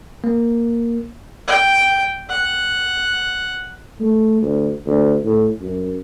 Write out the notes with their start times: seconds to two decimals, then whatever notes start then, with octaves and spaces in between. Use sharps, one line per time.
0.24 A#3
1.48 G5
2.29 F#5
4.00 A3
4.42 D2
4.86 D2
5.24 A2
5.61 F#2